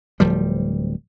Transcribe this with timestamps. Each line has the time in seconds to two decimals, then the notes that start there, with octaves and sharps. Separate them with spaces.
0.20 D1 F3 G3